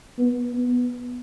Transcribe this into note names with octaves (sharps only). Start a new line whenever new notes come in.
B3
B3